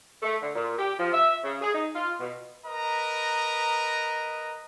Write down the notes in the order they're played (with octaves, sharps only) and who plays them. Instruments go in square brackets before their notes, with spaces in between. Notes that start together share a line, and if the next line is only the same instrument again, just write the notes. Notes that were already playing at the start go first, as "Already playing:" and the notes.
[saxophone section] A3
D3
A#2
G4
F3
E5
C#3
G#4
D#4
F4
B2
[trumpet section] A#4 B4 D#5 A#5